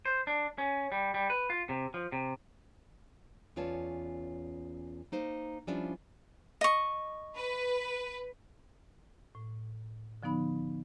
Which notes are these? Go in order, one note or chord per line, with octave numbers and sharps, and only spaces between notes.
C5
D4
C#4
G3
G3
B4
F4
C3
F3
C3
E2 C#4 F4 C#5 D5 A5
A#3 D#4 C5
F3 G3 C#4 D4 E4 F4
D#5 C#6
B4
A2
D3 F3 B3 D#4 B5